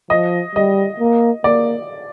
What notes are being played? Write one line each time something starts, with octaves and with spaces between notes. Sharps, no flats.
F3 D#5
G3 D#5
A#3
A#3 D5